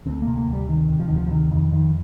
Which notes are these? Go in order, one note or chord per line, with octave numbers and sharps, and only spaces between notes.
D2 C4
A#3
C3
A#3
D2
G3
C3 D#3
C3
F3
D2 D#3
F3
F3
C3 D#3
F2 D#3
F2 D#3